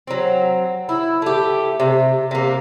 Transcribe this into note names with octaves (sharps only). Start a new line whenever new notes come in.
F#3 C4
E4
A3 G4
C3
C3 A#3